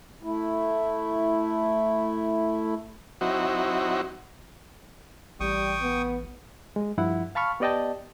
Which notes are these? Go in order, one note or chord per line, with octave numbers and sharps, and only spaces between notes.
A3 E4
F#3 C4 D#4 E4 F#4
A1 G3 G5 C#6 D#6
B3
G#3
G2 F3 E4 F#5
F5 A5 B5 C#6 F6
B3 G4 D5 D#5 G5 A5